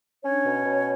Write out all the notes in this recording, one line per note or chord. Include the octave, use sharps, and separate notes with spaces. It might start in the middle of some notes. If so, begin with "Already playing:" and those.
C#4 D4 C#5
B2
B2